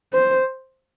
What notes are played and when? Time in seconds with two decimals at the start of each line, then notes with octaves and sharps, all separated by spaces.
0.13 C5